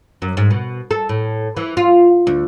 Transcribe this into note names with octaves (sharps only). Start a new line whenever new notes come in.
F#2
G#2
B2
A4
A2
E3
F4
D2